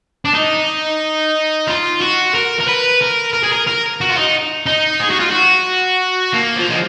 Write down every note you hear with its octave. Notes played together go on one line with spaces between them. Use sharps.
D4
D#4
F4
F#4
A#4
A#4
B4
A#4
A#4
G#4
A#4
A#4
F#4
F4
D#4
D#4
G#4
F#4
F4
F#4
A#3
F3
G#3